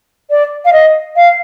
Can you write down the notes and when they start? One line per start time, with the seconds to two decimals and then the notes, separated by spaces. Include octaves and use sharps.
0.30 D5
0.65 F5
0.73 D#5
1.16 F5